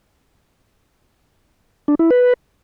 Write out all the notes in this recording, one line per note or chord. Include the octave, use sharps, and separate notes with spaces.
D4
E4
B4